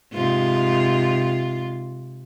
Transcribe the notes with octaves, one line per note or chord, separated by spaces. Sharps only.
G#2 C3 F4